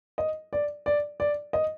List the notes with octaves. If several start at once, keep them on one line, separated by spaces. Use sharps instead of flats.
D#5
D5
D5
D5
D#5